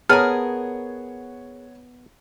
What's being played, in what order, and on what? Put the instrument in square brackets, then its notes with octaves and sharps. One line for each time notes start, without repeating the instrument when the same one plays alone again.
[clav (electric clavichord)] B3 A5 [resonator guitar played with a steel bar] G#4 A#4 [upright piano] C#5 F#5 [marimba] F6